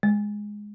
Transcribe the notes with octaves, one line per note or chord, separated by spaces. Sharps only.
G#3